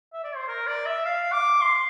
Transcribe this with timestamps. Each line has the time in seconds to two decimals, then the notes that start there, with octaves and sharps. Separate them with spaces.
0.13 E5
0.24 D5
0.36 C5
0.48 A#4
0.67 D5
0.86 E5
1.05 F5
1.33 D6
1.62 C6